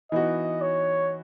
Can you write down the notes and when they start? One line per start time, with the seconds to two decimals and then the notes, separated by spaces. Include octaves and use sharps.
0.12 E3 B3 D#4 F#4 D#5
0.62 C#5